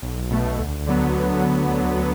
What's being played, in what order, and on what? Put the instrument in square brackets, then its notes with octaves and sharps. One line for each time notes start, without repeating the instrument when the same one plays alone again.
[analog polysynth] B1
B2 A3
D2
D3 F#3 B3